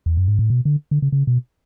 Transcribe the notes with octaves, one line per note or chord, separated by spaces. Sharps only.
E2
F#2
G#2
A2
B2
D3
D3
C#3
C#3
B2